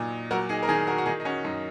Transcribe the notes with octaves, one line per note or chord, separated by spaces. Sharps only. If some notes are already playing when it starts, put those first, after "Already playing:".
Already playing: A#2 F#3 D#4
F#3 F#4 A#4
D#4 G#4
A#4
D#3 D#4 G#4
F#4 A#4
F#4
D#3 D#4 G#4
D#4
C#4 F#4
F#2 D#4